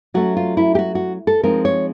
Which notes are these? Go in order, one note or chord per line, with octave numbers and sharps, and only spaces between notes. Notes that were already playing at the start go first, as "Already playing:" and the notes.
F#3 A3 C#4 F#4
F4
E4
G4
F#4
F#4
A4
F3 G#3 C4 D#4 A#4
C#5